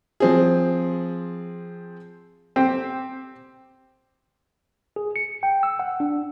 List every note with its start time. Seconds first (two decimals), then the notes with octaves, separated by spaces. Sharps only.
0.20 F3 C4 G#4
2.56 C4 G4
4.96 G#4
5.16 C#7
5.43 G5
5.63 E6
5.79 F#5
6.00 D4